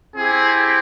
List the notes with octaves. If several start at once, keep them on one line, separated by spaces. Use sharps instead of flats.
C4 E4 G4 G#4